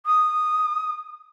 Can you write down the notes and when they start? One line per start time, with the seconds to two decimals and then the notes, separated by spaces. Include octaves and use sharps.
0.06 D#6